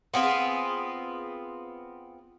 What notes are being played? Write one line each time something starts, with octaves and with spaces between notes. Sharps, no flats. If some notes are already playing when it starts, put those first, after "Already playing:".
B3 C4 F4 G#4